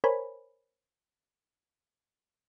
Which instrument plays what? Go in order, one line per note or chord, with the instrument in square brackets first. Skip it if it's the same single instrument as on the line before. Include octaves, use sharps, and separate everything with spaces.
[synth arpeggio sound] A#4 C5 C#5 G#5 B5